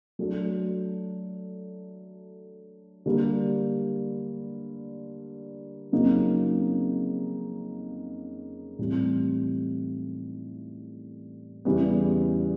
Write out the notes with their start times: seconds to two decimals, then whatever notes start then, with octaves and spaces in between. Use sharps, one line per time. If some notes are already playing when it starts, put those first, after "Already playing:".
0.19 F#3 A3 D4 F#4 A4
3.06 D3 G3 A#3
5.92 F2 C#3 F#3 A#3 D#4
8.79 A2 E3 G3 C4
11.65 E2 C#3 E3 G3 B3